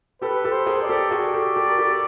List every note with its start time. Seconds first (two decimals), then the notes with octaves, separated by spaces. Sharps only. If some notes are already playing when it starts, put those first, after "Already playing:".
0.21 G4 A4 B4
0.44 G4 A4
0.51 C5
0.66 G#4 A#4
0.82 D5
0.89 G4 A4
1.11 F#4 G#4 D5
1.34 G4 A4
1.56 G4 A4
1.68 A#4
1.78 G4 A4
1.91 A4